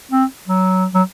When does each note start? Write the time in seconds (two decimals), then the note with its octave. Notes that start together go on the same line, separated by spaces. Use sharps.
0.11 C4
0.48 F#3
0.94 F#3